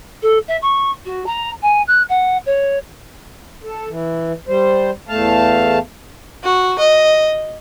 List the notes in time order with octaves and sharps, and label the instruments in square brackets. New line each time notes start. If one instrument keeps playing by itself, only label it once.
[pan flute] A4
E5
C#6
F#4
A#5
G#5
F#6
F#5
C#5
[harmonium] A4
E3
G3 C5
E2 A3 F5 A5
[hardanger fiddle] F#4
D#5